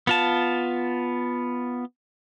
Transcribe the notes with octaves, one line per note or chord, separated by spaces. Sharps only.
B3 F4 A5